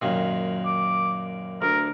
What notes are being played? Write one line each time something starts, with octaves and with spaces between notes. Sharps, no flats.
F#2 A#2 D#3
D6
D2 A#4